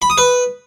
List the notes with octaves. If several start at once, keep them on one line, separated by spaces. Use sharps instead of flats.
B5
D#6
B4